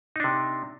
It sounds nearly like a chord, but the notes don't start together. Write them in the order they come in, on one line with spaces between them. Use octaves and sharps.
D#4 D4 C3